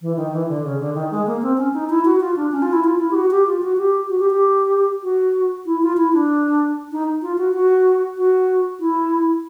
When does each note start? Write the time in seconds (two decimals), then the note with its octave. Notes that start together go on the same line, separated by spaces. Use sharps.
0.02 E3
0.17 D#3
0.32 E3
0.48 D3
0.64 C#3
0.80 D3
0.95 D#3
1.11 G#3
1.26 A#3
1.42 C4
1.58 C#4
1.74 D#4
1.90 E4
2.05 F#4
2.20 F4
2.36 D4
2.52 C#4
2.62 F4
2.73 E4
2.84 F4
2.99 E4
3.11 G4
3.15 F#4
3.31 G4
3.47 F4
3.62 F#4
3.77 G4
4.09 F#4
4.19 G4
4.31 G4
5.03 F#4
5.66 E4
5.82 F4
5.97 E4
6.13 D4
6.92 D#4
7.22 F4
7.38 F#4
7.54 F#4
8.17 F#4
8.80 E4